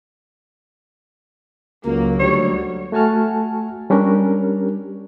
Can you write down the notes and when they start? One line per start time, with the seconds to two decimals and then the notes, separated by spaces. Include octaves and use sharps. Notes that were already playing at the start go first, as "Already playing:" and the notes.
1.85 C#2 F#3 A#3
2.19 D2 G3 C#5
2.92 A3 F#4 G#5 A5 F6
3.90 G3 C#4 D4 G4 A#4